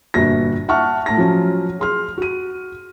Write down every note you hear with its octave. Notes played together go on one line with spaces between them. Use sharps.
G1 A#2 F#4 A#6
E5 F#5 A5 C#6 F6
A2 A5 A#6
F3 F#3 C#4
G#4 C6 F6
F#4 D#7